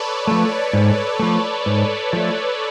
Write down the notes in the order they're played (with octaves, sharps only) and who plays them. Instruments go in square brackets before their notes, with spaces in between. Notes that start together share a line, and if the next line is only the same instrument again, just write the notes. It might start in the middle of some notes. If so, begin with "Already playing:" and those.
Already playing: [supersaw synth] A4 B4 C#5 D5
B4
[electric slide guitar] F3 A3
[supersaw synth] B4
[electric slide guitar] G#2
F3 A3
G#2
F3 A3